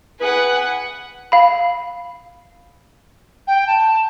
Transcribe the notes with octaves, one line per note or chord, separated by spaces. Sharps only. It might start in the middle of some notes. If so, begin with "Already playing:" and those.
E4 G#4 B4 F#5 G#5
F5 B5
G5
A5